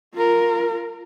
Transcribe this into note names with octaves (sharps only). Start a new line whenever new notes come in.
F4 A#4